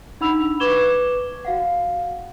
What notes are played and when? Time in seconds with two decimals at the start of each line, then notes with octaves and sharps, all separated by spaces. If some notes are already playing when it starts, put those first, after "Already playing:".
0.20 D4 D#4 F#5 B5 E6 F7
0.60 B4 C#6 D6 G#6 E7 G7
1.45 F#4 F5 F#5